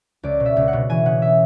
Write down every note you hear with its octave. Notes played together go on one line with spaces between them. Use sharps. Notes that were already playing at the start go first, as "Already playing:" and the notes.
C#2 D5
B2
E5
C#2
F#5
B2
E3 G#5
C#3 F#5
E5